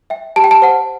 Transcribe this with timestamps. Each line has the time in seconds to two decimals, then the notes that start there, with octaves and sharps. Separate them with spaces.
0.10 E5 G5
0.36 G4 A5
0.44 G5
0.51 A5
0.62 C5 F#5